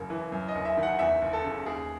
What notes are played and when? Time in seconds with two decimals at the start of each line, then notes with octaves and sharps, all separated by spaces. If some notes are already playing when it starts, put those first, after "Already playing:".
Already playing: F#1 F#2
0.10 E3
0.32 F#2
0.48 D#5
0.55 F#1
0.65 E5
0.77 D#3
0.83 F#5
0.99 E2 E5
1.22 F#1
1.33 A4
1.44 C#3
1.66 D#2 G#4